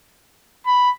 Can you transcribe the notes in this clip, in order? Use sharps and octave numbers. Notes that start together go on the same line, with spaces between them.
B5